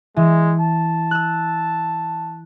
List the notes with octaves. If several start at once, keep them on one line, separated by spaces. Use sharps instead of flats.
E3 G#3
A5
E6 F#6